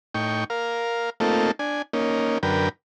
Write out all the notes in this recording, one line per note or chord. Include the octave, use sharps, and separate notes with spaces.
A2 D#4 G5 C#6
A#4 F5
A3 A#3 C4 D#4 F4 A4
D4 G#5
A#3 C#4 D#4
F#2 D3 A#4 B4 G5